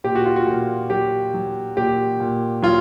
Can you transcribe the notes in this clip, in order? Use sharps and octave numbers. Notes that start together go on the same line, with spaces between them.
A#2 G4
F#4
F4
F#4
A#2
F#3 G4
F#3
A#2 G4
A#2
F#3 F4